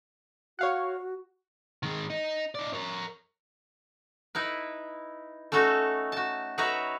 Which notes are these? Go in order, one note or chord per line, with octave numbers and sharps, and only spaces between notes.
F#4 C#5 F5 F#5
D#3 G#3
D#4
D#4 D5
A#4 C#5
D#4 E4 B4
A3 C#4 D#4 F#4 A4
F#4 A5
F#3 D#4 B4 C#5 E5 A#5